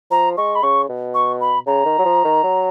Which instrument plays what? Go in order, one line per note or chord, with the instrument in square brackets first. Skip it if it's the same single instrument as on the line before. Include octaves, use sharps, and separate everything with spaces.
[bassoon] F3 [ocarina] A#5
[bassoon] G#3 [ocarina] C#6
[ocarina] B5
[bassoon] C#3 [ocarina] C#6
[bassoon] B2
[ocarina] C#6
B5
[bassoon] C#3 [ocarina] A#5
[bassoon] D#3
F#3
F3
D#3
F#3